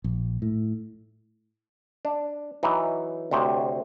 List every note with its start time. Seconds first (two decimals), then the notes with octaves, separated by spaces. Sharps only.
0.04 A#1
0.42 A2
2.05 D4
2.63 E3 F#3 D#4
3.31 D2 C3 C5 C#5 D#5